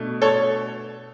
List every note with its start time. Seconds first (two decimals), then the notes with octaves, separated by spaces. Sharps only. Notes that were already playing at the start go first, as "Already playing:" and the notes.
Already playing: B2 A3 D4
0.22 A4 C#5